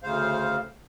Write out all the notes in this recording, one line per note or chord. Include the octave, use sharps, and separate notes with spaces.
D2 C#3 C5 F5